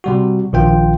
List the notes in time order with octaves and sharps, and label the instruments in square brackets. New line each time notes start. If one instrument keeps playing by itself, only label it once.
[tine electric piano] C3 G3 F#4
A#1 D#3 F4 G5